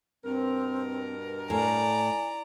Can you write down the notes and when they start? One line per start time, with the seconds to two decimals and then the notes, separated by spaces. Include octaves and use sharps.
0.24 G2 B2 C4 A#4
1.50 A2 D5 G#5 A#5